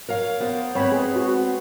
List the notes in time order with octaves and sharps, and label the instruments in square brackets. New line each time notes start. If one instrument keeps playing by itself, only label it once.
[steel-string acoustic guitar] A#4 C#5 F5
B3 A#4 C5
[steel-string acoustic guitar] G#3 B3 C4 [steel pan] C#5 B5
[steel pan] G#4
F#4